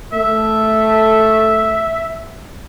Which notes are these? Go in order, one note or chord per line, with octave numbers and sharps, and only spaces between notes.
A3 E5